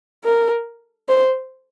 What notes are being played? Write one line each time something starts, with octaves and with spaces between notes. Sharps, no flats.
A#4
C5